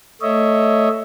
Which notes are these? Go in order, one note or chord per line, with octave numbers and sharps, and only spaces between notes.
A3 C#5 D#5 E5